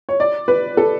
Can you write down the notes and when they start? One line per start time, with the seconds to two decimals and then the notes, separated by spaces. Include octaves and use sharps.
0.09 C#5
0.20 D5
0.48 B4
0.77 A4